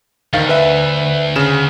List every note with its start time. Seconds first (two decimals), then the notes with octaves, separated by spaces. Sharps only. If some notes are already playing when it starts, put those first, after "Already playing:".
0.33 D2 D#3 F5 A6
0.49 B4 E5
1.36 C#3 E7